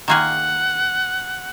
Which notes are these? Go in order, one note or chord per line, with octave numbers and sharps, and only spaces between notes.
D#3 A#3 F4 G#4 F#5